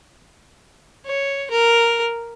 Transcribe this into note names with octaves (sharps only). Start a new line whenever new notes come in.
C#5
A#4